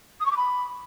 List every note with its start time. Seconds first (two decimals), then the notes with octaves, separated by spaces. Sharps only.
0.20 D#6
0.25 C#6
0.31 D6
0.37 B5